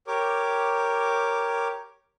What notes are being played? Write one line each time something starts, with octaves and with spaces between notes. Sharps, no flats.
G4 A#4 C#5 D6